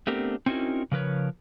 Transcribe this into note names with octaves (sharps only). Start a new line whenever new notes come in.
A3 B3 C4 D4 G4 A#4
C4 C#4 D#4 E4 F#4 A#4
C#3 F3 A#4 B4 C#5